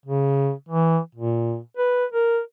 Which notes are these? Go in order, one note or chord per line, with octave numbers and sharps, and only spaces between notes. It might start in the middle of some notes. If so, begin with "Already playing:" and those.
C#3
E3
A#2
B4
A#4